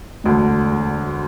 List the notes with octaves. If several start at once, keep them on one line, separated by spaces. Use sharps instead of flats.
E1 D2 D3